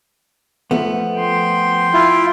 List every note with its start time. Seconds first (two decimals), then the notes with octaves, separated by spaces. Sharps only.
0.71 F3 A3 B3
1.19 G5 C6
1.93 E4 F4